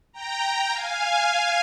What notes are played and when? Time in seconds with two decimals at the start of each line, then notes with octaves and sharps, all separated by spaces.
0.13 G5 A#5
0.41 G5 A#5
0.70 F5 G#5